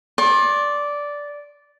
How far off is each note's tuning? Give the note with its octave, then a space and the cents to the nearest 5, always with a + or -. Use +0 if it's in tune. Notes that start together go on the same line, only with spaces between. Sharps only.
D5 -10 C6 +40